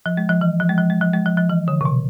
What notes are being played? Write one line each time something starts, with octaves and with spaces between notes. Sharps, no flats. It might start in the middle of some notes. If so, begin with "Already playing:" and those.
F3
G#3
F3
E3
F3
G#3
F3
G#3
F3
G#3
F3
F3
E3
D3
C3
B2